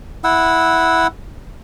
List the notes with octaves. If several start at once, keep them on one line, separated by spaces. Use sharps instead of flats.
E4 F#5 E6